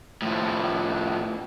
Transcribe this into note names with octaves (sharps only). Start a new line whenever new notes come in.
A2 F3